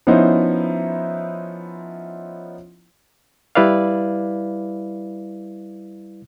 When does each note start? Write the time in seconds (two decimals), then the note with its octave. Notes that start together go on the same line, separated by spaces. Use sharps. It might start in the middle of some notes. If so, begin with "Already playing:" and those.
0.07 F3 B3 C#4 D#4 E4 C5
3.55 G3 E4 B4 D5 F5